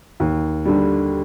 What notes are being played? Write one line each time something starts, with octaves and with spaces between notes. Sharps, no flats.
D#2
D3 G3